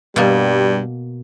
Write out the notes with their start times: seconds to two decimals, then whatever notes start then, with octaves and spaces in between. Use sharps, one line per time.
0.16 G2 B2 G3 A#3